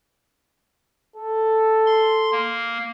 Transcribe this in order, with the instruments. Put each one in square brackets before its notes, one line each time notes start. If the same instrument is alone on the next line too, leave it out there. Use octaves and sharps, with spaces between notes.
[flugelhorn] A4
[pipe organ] C6
A#3